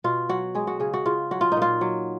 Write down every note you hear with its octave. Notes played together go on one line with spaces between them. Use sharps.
B2 F4
F#3 F#4
G#3 G#4
F#4
C#3 G#4
F#4
C#3 F4
F#3 F#4
F4
A#2 D#4
F4
F#3